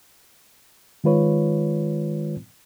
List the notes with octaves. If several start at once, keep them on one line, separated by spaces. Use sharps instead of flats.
D#3 G#3 F4 B4 C#5